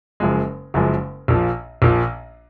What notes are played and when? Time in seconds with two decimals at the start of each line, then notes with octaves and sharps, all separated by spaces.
0.20 F#1 F#2 F3 G#3
0.74 F#1 F#2 F3 G#3
1.28 A#1 A#2 F3
1.82 A#1 A#2 F3